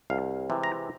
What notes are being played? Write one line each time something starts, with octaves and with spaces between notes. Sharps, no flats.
C2 F5
C3 E3 G#3 C4
A#5